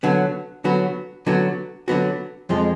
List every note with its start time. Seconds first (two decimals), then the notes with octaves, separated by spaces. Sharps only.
0.03 D3 F#3 B3 F#4
0.64 D3 F#3 B3 F#4
1.26 D3 F#3 B3 F#4
1.88 D3 F#3 B3 F#4
2.49 F2 F3 G#3